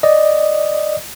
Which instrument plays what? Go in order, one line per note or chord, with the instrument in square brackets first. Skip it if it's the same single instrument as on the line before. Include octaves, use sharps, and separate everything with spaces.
[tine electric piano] D5 D#5